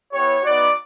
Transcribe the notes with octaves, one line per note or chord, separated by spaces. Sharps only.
B3 E4 G4 C#5
B3 D#4 F#4 D5